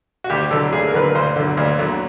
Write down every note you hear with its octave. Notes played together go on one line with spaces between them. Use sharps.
F#4
D2 G4
D3 F#3 A4
D2 G#4
A#4
D3 F#3 B4
A#4
D2 C5
D3 F#3
D2
D3 F#3